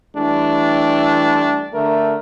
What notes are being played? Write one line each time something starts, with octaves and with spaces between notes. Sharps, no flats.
E3 G3 A3 D4
D3 A3 A#4